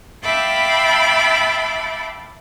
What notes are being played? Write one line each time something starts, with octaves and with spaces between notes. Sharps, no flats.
E5 F5 G5 A5 B5 D6